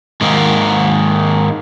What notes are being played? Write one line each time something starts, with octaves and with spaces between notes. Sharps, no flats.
G#2 D#3 A#3